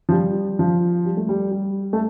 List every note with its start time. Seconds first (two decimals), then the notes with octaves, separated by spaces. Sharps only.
0.09 F3
0.12 G3
0.59 F3
1.05 G3
1.17 A3
1.29 G3
1.51 G3
1.93 A3